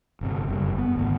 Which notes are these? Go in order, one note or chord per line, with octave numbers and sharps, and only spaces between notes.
G1 C3
F#1 G2
B3
G#1 D2